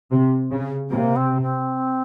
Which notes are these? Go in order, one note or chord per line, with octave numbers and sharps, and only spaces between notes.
C3
C#3
C3 A#3
C4
C4